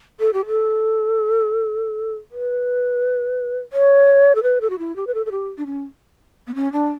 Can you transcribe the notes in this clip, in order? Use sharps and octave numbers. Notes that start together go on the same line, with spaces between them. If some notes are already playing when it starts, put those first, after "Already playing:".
A4
G4
A4
B4
C#5
A4
B4
A4
F#4
E4
G4
B4
A4
A4
G4
D4
C#4
B3
C#4
D4